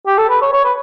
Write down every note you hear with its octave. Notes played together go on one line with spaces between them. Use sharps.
G4
A4
B4
C#5
C#5
B4